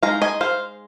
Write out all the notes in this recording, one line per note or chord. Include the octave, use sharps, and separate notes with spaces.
G#3 D#4 F5 A#5
D#5 G#5
C5 F5